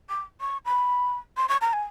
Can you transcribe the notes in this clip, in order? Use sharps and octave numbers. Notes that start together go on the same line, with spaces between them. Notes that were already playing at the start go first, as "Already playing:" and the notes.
D6
C#6
B5
C6
C#6
A#5
G#5